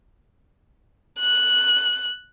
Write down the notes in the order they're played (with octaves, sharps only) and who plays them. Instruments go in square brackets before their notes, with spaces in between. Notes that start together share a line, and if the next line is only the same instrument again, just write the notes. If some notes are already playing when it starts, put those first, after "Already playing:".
[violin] F#6